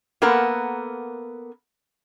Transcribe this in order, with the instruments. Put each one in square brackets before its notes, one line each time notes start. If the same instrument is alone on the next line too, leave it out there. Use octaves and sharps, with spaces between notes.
[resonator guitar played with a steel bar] A#3 B3 A4 A#4 F#5